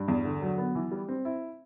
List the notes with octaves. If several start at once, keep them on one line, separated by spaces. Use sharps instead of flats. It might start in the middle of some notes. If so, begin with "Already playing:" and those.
Already playing: G2
E2
D3
F#3
B3
E3
G3
C4
E4